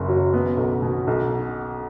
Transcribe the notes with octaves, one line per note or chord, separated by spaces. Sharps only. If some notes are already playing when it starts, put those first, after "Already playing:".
Already playing: F#1 F#2
F#3
B3
B1
B2
B1